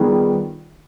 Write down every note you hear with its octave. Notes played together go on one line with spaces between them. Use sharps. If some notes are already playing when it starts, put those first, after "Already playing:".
Already playing: D#3 G3 B3 F4 G#4